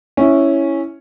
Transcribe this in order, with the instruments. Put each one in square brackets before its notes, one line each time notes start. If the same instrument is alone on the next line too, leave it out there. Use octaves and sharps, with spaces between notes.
[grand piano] C#4 E4